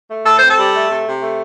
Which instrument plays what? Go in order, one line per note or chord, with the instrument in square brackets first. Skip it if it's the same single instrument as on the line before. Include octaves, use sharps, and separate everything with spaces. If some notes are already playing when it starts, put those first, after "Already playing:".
[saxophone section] A3
A2 A4
C4 C5
A4
G3
A3
C3
C3
A3